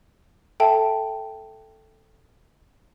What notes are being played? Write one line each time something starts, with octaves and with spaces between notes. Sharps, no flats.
A4 E5 G5 A5